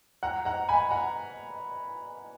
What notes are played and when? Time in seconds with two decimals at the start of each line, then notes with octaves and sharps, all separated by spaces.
0.23 F#5 A#5
0.45 F#5 A#5
0.69 G#5 B5
0.91 F#5 A#5